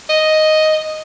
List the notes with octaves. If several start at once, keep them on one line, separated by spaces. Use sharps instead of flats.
D#5